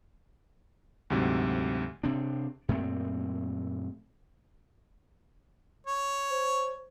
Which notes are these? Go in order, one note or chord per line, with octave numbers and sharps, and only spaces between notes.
D2 G#2 C3 F#3
C3 C4 D4
F#2 A#2 A3 C4
C#5
C5